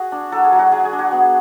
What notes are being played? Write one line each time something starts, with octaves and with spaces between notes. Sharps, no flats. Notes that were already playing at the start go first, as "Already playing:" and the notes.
Already playing: F#4 G#4
D4
F#3 A4
G#4
F#3
F#4
F#3 G#4
G#4
D4
F#4
B3